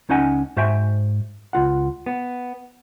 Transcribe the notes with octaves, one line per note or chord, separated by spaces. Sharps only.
C#2 C#4 D#4 F#5 G#5
G#2 F#4 C5 E5 G5 G#5
C#2 F4 F#5
B3